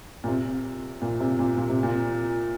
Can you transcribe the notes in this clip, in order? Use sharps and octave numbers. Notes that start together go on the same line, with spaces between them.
A#2
C3
A#2
C3
A#2
A#2
C3
A#2